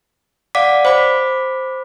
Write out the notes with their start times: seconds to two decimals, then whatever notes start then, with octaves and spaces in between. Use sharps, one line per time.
0.55 D5 F5 F#5 D6 B6
0.85 C5 B5 D6 B6